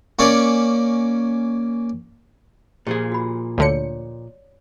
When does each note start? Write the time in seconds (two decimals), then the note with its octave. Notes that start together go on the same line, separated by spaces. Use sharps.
0.19 A#3 C#4 C#5 D5
2.87 A#2 F3 G4 G#4
3.12 F#4 B5
3.58 D2 D3 C#5 D5 C#7